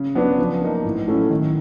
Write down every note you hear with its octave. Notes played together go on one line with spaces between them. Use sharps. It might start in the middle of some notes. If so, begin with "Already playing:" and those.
Already playing: C#3
F#3 B3 D4
F3
A#3 D#4
A2
F#3 A3 C#4 E4
D#3